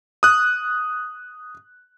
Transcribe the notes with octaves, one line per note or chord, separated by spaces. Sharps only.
D#6 F#6